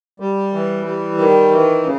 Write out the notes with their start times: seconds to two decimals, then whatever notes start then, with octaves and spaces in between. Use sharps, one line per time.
0.20 G3
0.53 E3
0.85 G3
1.18 D#3
1.51 E3
1.83 C#3